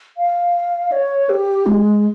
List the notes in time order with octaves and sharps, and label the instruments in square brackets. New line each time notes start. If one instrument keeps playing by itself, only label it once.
[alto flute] F5
C#5
G4
G#3